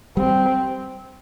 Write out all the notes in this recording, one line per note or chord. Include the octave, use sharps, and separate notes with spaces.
G3 C4